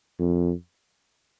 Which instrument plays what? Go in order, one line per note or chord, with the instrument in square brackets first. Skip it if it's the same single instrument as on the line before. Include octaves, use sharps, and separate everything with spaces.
[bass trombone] F2